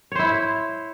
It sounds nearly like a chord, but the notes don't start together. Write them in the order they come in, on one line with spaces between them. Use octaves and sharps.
C#5 C5 E4